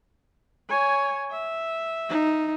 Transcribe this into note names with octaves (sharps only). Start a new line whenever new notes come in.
C#5 G#5
E5
D#4